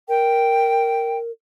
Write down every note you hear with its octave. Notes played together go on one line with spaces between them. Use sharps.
A#4 G5